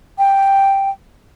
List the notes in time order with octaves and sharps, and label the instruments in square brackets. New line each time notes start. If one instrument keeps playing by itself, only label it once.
[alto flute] G5